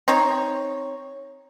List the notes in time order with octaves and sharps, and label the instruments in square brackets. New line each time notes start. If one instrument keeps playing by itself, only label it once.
[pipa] C4 D#4 C#5